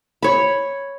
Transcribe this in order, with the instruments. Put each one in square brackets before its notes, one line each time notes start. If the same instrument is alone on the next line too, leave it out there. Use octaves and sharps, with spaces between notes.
[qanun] C#5 B5